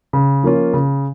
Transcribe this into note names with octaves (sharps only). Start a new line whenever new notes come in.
C#3
F3 A#3 C#4 F4
C#3